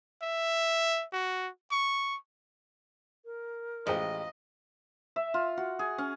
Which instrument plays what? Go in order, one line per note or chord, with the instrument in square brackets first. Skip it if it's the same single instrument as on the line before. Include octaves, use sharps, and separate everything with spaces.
[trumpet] E5
F#4
C#6
[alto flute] A#4
[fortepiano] A1 G#3 G5 [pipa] F3 [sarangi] D#5
[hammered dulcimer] E5
F4
F#4
G#4
C#4